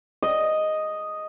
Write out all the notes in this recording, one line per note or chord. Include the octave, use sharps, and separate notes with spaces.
D#5